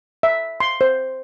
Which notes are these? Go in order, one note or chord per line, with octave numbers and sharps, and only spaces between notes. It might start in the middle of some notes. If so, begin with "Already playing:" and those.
E5
C6
C5